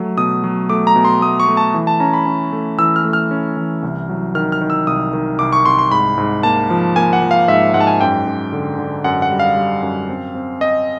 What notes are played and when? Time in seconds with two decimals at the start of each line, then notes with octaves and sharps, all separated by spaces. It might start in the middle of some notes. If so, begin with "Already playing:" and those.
Already playing: F#3 A3
0.17 B2 D#6
0.44 F#3
0.69 A3 D6
0.87 A#5
0.96 B2
1.05 C6
1.22 A3 D#6
1.40 C#6
1.48 A3
1.57 A5
1.74 E3
1.87 A5
2.00 C#4 A#5
2.13 B5
2.26 C#4
2.52 A3
2.78 E3 E6
2.96 F6
3.05 A3
3.13 F6
3.31 C#4
3.57 E3
3.83 C2
4.09 F#3
4.35 D#3 F6
4.52 F6
4.61 D#3
4.70 E6
4.87 C2 D#6
5.13 D#3
5.39 C2 D6
5.53 C#6
5.66 C2 C6
5.79 C6
5.91 G#2 B5
6.18 G#2
6.43 A#3 A5
6.70 F3
6.96 A#3 G#5
7.13 F#5
7.22 F3
7.31 F5
7.48 G#2 E5
7.74 G#2 F#5
7.80 A5
7.87 G#5
8.01 F#2 G5
8.26 F#2
8.53 D3
8.79 D3
9.04 F#2 F#5
9.22 F#5
9.31 G3
9.39 F5
9.56 G3
9.83 F#2
10.09 C4
10.35 C4
10.61 C4 D#5